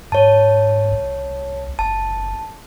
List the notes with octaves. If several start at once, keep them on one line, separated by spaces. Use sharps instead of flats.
G#2 C#5 A5
C2
F#1 A5